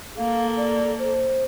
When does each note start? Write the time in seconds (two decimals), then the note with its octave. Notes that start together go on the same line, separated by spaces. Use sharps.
0.17 A#3 A4 F5
0.57 D5
0.99 C5